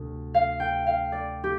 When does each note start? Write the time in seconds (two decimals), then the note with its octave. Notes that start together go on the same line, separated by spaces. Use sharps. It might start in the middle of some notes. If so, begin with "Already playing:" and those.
Already playing: D2 C3
0.34 F5
0.60 G5
0.87 F5
1.12 D5
1.44 G4